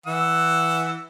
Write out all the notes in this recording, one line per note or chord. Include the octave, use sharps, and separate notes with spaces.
E3 F#5 E6